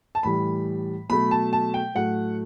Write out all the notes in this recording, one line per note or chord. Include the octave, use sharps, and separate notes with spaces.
A5
A2 E3 G3 B5
B2 F#3 A3 B5
A5
A5
G5
A2 F#3 A3 F#5